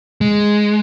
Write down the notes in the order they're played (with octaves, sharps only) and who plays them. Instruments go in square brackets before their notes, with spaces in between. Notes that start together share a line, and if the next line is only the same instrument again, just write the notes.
[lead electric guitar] G#3